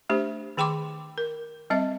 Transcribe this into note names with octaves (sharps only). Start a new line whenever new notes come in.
A3 D4 G4 C5
D#3 G#4 G5 B5 C6 D6
A#4
G3 C4 D#5 E5